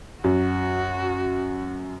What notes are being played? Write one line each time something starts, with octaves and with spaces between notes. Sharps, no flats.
F#2 F#4